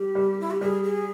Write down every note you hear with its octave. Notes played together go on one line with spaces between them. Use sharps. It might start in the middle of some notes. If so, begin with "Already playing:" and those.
Already playing: G3 G4
G3
E4
G4
G3 G#4
G#4